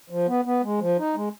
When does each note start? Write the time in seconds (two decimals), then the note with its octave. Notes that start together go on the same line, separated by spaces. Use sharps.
0.10 F3
0.28 B3
0.45 B3
0.63 G#3
0.80 F3
0.99 D#4
1.15 G#3